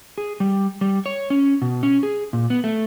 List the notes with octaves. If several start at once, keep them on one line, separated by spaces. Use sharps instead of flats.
G#4
G3
G3
C#5
C#4
B2
C#4
G#4
A#2
B3
A3